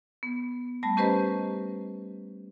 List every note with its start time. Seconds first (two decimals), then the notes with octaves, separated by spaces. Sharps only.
0.23 B3
0.83 G3 A3 A5 B5
0.97 C#4 G4 B4 C5 D#5 A#5